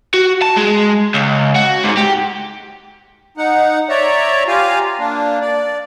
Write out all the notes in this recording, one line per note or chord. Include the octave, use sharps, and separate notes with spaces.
F#4
A5
G#3
C#2
F#4
G#2
G4
D#4 F#5
C#5 D5 E5 A#5
F4 G4 F5 G#5 A#5
A#3 D4
D5